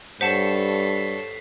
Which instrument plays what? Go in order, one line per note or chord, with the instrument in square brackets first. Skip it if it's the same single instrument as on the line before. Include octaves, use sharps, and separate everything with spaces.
[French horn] G2 [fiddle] A4 C#5 [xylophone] C5 F#5 A5 [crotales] B6 C7